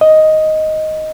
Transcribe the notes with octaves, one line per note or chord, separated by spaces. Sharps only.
D#5